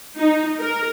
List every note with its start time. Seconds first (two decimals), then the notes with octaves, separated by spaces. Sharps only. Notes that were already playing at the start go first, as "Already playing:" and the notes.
0.18 D#4
0.59 A#4